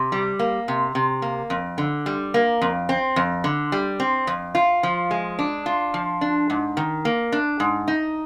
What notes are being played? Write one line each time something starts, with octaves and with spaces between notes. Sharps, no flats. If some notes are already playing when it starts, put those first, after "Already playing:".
Already playing: C3
G3
A#3
C3
C3
A#3
F2
D3
G3
A#3
F2
C4
F2
D3
G3
C4
F2
F4
F3
G#3
D4
F4
F3
D4
G#2
D#3
A#3
D4
G#2
D#4